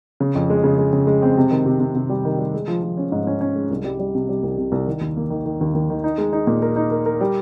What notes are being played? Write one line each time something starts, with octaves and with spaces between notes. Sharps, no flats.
C#3
F2
G#3
C#3
G#3
C#3
G#3
C4
C3
D#3
C3
C3
C3
G3
D#3
G3
G#3
F3
F3
C#4
G#2
C#4
C#4
G#3
C2
G3
G3
C3
G3
C2
C3
C2
D#3
D#2
A#3
D#3
D#3
D#2
D#2
D#3
D#4
G#3
D#4
A#2
A#4
D#4
A#4
A#4
G3